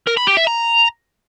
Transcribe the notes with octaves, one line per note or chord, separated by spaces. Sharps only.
A#4
B5
G4
E5
A#5